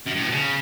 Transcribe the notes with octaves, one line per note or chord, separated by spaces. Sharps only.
F#2
A2
B2
C#3